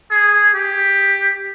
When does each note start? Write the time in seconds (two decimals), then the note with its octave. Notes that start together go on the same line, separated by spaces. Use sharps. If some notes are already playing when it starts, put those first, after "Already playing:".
0.11 G#4
0.54 G4